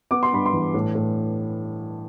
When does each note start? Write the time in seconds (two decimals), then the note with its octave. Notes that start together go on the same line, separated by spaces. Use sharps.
0.11 B3 D6
0.23 C6
0.32 G2 B5
0.46 C6
0.53 E3
0.74 A2
0.95 A2